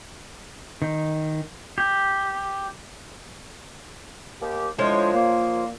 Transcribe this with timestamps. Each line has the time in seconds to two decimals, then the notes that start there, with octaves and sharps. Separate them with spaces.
0.82 D#3
1.78 G4
4.41 D#2 G4
4.79 A2 D3 F3 G#3 C5 C#5
5.14 A#2 A#3